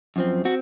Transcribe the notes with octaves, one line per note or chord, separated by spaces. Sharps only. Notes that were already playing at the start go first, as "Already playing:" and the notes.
F#2 F3 C4
C4 F#4